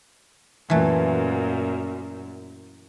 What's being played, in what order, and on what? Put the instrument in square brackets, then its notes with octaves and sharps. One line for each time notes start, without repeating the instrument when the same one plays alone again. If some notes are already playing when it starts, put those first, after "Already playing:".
[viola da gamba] F#2 A#2 [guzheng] E3 A3